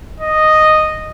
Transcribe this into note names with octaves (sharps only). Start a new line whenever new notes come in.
D#5